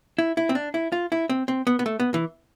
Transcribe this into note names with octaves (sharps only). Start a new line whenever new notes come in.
E4
E4
C4
D4
E4
F4
E4
C4
C4
B3
B3
A3
B3
E3